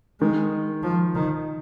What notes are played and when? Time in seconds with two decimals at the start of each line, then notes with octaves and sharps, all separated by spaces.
0.21 D#3 G#3
0.83 F3
1.15 D#3